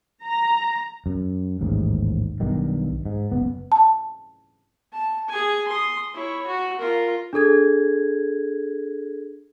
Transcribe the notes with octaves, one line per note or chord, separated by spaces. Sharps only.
A#5
F#2
A1 D#2 G#2
B1 G2 D#3
G#2
F#1 B3
A5
A5
G#4 G#5
C6 D#6
E4 C#5
F#4
F4 A#4
D4 G#4 A4 G#6